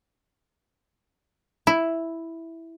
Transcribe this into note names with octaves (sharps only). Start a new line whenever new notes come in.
E4